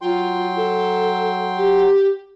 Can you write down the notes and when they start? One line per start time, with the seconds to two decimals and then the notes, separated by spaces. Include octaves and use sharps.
0.01 F#3 F4 G5 C6
0.56 A4
1.57 G4